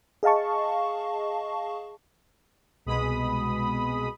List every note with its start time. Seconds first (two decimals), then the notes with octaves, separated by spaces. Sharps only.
0.23 G#4 D#5 F5 A5 C#6
2.85 C2 B2 G#3 B5 D#6